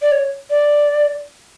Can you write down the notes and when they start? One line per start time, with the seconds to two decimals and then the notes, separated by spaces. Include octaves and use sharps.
0.02 D5
0.12 C#5
0.50 D5